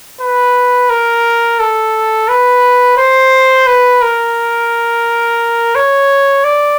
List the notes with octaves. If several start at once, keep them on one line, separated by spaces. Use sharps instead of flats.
B4
A#4
A4
B4
C5
B4
A#4
C#5
D5